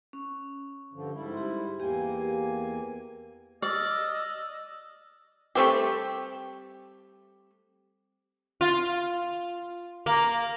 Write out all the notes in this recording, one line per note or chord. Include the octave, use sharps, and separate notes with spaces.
C#4
G2 D3 F3
G#2 G3 E4
G4 C6
E2 A#3 G4 G5 G#5
D5 D#5 E6 F6
G3 A3 C4 G4
F4
A#3